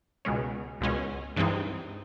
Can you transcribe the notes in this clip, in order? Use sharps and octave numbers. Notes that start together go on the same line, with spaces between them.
C#2 B2 G#3 C#4
C#2 B2 G#3 C#4
G2 E3 G#3 C4 D#4